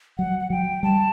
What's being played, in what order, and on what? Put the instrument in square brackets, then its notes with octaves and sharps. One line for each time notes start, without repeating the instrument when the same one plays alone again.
[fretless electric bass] F#3 [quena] F#5
[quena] F#5
[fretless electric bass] F#3 [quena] G5
[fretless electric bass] G3 [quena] A5